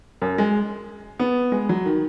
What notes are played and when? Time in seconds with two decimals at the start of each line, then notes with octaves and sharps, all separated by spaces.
0.22 F#2
0.38 G#3
1.19 B3
1.52 G#3
1.69 F#3
1.86 D#3